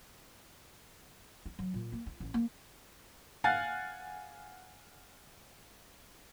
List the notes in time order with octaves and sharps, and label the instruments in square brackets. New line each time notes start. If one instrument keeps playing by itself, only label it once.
[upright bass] E4
F#3
A#2
A#3
F4
A1
A#3
[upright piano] F5 F#5 G#5 F6 F#6 A6